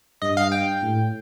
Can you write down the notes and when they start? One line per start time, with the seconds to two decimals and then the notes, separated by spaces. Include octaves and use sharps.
0.22 G2 D#5
0.37 F5
0.52 G5
0.82 A2